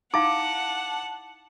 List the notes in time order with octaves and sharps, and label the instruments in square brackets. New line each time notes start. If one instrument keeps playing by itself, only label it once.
[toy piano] D#4 E4 F5 [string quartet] F#5 A5 [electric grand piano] D6